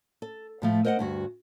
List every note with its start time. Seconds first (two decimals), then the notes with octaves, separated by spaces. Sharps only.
0.22 A4
0.62 A2 F3 A3
0.85 A#4 C5 D#5 E5 F#5
0.99 D2 G2 F#4